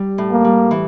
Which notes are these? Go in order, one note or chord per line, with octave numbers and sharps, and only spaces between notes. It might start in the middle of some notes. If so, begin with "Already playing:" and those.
Already playing: G3
A2
A#3
G3
E3